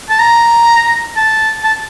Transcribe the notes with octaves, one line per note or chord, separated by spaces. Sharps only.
A5
A#5
A5
A5